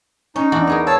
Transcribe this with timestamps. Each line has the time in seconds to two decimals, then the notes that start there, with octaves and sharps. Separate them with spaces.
0.36 C#4 D#4
0.52 E2 D4 F#4
0.67 B3 G#4 A#4
0.87 C#5 F5 A5 E6